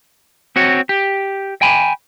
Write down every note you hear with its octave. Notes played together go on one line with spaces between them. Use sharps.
C4 F#4 C#5
G4
G5 G#5 B5